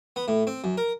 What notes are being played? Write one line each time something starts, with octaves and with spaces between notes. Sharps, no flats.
B3
A2
C4
F#2
A#4